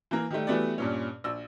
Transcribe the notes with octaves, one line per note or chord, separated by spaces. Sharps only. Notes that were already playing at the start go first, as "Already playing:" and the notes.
E3 A#3
D#3 G3 A3
E3 G3 A3 B3 F#4 D5
G2 A#2 C#4
A#1 E6